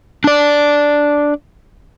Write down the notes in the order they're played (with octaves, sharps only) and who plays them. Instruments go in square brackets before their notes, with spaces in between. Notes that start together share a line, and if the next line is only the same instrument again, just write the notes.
[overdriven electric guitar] D4 D5